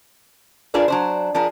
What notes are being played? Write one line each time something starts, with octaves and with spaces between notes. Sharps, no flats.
D4 F4 G#4 A#4 B4 D5
F#3 D4 C5
F3 D4 G#4 A#4